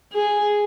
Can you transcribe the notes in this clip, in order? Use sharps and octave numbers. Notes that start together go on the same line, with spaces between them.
G#4